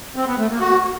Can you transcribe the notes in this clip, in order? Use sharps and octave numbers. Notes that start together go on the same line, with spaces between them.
C4
B3
A3
A#3
F#4